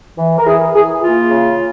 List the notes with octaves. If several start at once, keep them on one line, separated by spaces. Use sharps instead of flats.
E3
A#4
E3 G#4
E3 G#4
A#3 F4
C#3